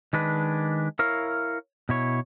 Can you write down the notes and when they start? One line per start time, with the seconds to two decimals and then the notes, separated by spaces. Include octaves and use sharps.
0.13 D#3 G#3 D4 B4
0.99 E4 A#4 C#5 F5
1.89 B2 E4 C#5